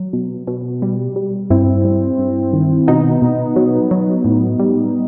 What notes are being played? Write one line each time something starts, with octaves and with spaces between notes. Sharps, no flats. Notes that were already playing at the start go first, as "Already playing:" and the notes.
Already playing: F#3
B2
B2
G3
G3
G2 C4 E4
G3
G2
D#3
B2 B3 D#4
B2
F#3
F#3
A2
G3